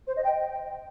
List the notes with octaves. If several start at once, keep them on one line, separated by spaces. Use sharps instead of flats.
C5
D#5
G5